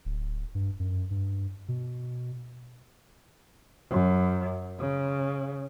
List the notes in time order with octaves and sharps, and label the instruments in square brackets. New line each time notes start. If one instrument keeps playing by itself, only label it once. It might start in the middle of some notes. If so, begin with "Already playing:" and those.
[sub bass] D1
G2
F#2
G2
B2
[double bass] F#2
C#3